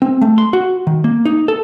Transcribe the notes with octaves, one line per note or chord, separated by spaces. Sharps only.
C4
A3
C6
F#4
D#3
A#3
D#4
A4